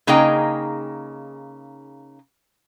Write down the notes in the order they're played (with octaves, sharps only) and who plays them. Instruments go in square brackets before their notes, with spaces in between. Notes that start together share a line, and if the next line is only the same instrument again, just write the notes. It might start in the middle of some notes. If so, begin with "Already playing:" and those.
[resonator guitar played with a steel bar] C#3 A#3 D#4 G#4 D#5 G5